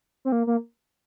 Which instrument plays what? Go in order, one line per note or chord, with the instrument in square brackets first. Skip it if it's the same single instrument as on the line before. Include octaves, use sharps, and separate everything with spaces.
[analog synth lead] C4
A#3
A#3